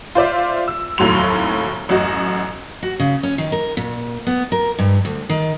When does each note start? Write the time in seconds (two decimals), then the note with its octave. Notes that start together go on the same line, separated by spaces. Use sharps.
0.15 F4 C5 D5 E5
0.68 E6
0.98 F1 D#2 A2 F#3 C6 F7
1.89 A1 F#2 F#4 D#5
2.83 F#4
3.00 C#3
3.23 C#4
3.38 D#3
3.52 A#4
3.77 A#2
4.27 B3
4.52 A#4
4.79 G2
5.05 D2
5.29 D#3